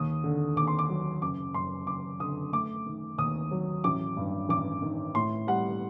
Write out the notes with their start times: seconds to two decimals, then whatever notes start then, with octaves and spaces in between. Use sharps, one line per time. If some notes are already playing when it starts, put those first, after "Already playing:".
Already playing: D#2 D#6
0.24 D3
0.56 D#2 D6
0.67 C6
0.79 D6
0.89 F#3
1.22 F#1 D6
1.54 F#2 C6
1.87 F#1 D6
2.20 D3 D#6
2.53 A3 D6
2.86 D#3
3.18 D#2 D#6
3.51 F#3
3.84 A1 D6
4.17 G2
4.49 A1 D6
4.82 D#3
5.15 A2 C6
5.47 G3 F#5